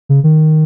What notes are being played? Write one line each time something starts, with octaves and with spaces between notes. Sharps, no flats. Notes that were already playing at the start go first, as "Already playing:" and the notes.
C#3
D#3